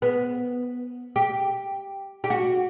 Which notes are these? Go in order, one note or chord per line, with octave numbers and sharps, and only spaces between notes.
B3
G4
G4
F#4